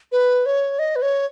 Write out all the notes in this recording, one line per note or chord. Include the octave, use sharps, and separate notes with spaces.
B4
C#5
D#5
B4
C#5